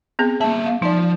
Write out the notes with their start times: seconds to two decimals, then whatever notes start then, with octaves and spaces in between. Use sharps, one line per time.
0.19 B3 C4 G#4
0.41 A#3 E5 A5
0.66 F5
0.82 F3 D#4 D5